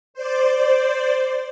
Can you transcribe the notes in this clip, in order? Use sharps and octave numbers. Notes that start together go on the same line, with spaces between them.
C5 D5